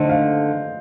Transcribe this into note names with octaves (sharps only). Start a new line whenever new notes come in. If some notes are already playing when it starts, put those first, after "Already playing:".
Already playing: D3 A3 D#4 C5 D#5
F5